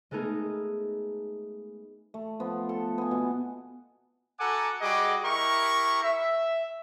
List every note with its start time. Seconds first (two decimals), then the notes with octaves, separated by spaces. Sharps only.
0.11 G#3 A3 B3 D#4 G#4 A#4
2.14 A3
2.40 F3 B3
2.69 A4
2.98 B3 G#5
3.11 B2
4.40 F#4 A4 F#5 G#5 A#5 D6
4.81 G3 F#4 G#4 D#5 D6
5.24 E4 G4 A#4 A#5 C#6
6.03 E5